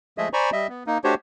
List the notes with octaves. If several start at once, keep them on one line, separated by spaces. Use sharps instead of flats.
F3 G#3 A3 G#4 D#5 E5
C5 D5 G#5 A#5 B5 C#6
G3 D#5 E5
B3
A#3 D#4
A3 D4 F#4 G4 C5 C#5